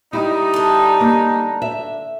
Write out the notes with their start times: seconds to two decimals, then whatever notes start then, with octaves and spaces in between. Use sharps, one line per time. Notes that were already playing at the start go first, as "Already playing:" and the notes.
0.13 G3 D#4 E4
0.54 D3 D4
1.01 A#3
1.62 E5